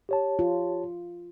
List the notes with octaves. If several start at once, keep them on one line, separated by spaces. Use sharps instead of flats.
G4 C#5 A5
F4